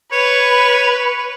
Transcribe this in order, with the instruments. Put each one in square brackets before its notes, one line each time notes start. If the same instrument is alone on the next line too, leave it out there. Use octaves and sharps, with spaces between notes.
[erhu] B4 [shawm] C#5